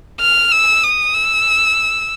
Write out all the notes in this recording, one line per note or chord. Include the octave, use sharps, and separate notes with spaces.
F6
E6
D#6
E6